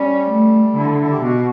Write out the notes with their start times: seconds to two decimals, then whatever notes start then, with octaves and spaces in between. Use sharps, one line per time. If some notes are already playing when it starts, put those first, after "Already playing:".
Already playing: G3 C#4
0.30 A3
0.76 D3 E4
0.99 E4
1.12 G4
1.22 B2 F#4